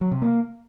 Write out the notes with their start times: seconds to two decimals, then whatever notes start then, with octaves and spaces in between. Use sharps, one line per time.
0.01 F#3
0.11 C3
0.22 A#3